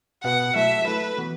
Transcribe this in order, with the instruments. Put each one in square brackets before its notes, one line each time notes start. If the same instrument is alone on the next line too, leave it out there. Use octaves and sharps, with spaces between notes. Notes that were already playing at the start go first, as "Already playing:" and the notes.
[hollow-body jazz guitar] B2 B3 F#4 B4 [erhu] F#5
[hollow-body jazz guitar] F#3 A3 E4 A4 [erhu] E5
[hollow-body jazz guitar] F#3 A3 E4 A4 [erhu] B4
[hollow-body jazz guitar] E3 B3 F#4